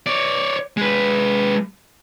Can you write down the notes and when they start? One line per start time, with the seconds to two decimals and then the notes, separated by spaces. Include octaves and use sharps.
0.07 C#5 D5
0.77 G#3 B4